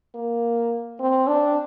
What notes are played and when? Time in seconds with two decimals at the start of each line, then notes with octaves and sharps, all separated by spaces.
0.15 A#3
1.00 C4
1.28 D4